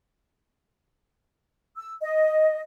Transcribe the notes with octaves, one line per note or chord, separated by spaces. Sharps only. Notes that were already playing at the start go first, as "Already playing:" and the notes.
E6
D#5